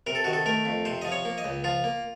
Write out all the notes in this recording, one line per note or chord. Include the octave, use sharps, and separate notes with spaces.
C3 A#4
A4
D#3 F#4
A4
A3 A#4
F2
C3 C5
F3 D#5
C#5
A#3
D#5
C#2
F3 F4
A#3